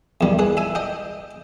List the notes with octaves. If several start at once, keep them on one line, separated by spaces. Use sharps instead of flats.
E2 D#3 G3
G#4 B4
E5 G#5
D#5 G5